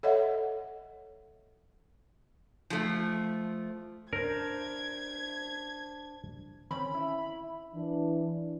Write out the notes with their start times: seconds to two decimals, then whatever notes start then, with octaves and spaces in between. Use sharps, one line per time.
0.03 A4 C#5 D#5 E5 F#5
2.70 F3 A3
4.13 D4 A#4 C5 G#6
6.71 D#3 C4 C#4 B5
6.94 E4
7.74 E3 D4